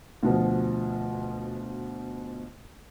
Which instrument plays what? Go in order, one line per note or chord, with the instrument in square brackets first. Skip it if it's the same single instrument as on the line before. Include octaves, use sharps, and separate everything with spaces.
[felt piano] D2 B2 F3